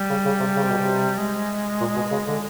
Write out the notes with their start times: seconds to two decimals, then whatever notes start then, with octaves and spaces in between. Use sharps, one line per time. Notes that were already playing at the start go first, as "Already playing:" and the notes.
Already playing: G3
0.10 C#3
0.25 C#3
0.40 C3
0.56 C#3
0.63 C3
0.71 B2
0.78 C3
1.18 G#3
1.80 A#2
1.95 B2
2.11 C#3
2.27 D3